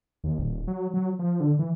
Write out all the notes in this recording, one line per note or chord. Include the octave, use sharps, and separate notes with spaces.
D#2
D#1
F#3
F#3
F3
D3
E3